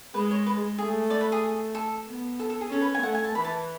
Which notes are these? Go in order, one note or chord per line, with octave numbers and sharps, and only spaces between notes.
G#3 B4
C#5
B4
A3 G#4
D5
B4
G#4
A4
B3
A4
A4
G#4
C#4 A4
B4
G#5
A3 F#5
G#5
A5
E3 B5
A5